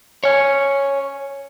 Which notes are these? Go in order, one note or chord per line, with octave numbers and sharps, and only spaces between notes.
C#5 G#5